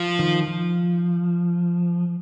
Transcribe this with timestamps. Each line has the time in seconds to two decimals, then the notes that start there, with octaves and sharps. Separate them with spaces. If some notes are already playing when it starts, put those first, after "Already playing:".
Already playing: F3
0.19 D#3
0.47 F3